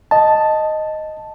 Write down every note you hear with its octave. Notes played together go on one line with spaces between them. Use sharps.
D#5 A5